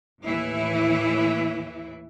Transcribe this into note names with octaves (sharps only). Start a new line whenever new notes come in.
D#2 A2 E3 E4